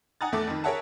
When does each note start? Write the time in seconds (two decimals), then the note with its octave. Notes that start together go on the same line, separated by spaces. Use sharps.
0.21 F#5 G#5 A#5 D#6 F#6 A6
0.32 E2 A3 A4 D6 A6
0.47 F2 D#3
0.64 G#4 A#4 C#5 E5 F#5 A5